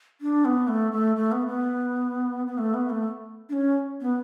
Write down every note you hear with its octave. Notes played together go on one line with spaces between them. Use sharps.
D4
B3
A3
A3
A3
B3
B3
B3
A3
B3
A3
D4
C#4
B3